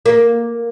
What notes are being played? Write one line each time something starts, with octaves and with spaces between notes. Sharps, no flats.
A#3